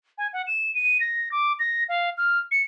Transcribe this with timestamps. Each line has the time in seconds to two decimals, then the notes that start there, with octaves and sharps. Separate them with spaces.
0.18 G#5
0.33 F#5
0.47 E7
0.74 D#7
1.00 A#6
1.32 D6
1.59 A#6
1.89 F5
2.17 F6
2.51 C#7